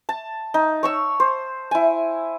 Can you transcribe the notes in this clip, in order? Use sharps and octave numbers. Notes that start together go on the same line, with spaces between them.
A5
D#4
C#5 C#6 E6
C5
E4 G#5